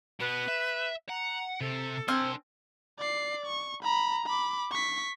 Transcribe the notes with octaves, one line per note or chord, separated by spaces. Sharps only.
B2 B3 B4
E5
F#5 A#5
C3 A4
C4 D4 G#5 C6 F6
D5 C7
C#6
A#5 B5
B5 D6
C#6 B6